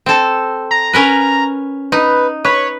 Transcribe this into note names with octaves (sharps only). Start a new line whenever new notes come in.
C4 A4
A#5
C#4 A#4 B4
D#4 B4
B4 C#5